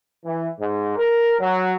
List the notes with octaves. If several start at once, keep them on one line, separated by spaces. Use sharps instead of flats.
E3
G#2
A#4
F#3